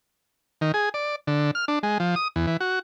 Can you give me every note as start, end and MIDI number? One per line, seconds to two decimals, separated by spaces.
0.61 0.72 51
0.74 0.89 68
0.94 1.16 74
1.27 1.51 50
1.55 1.65 89
1.68 1.79 62
1.83 1.98 56
2.00 2.15 53
2.16 2.28 87
2.36 2.46 40
2.47 2.57 52
2.60 2.79 66